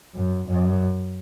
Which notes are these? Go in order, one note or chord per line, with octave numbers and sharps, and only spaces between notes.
F#2
F#2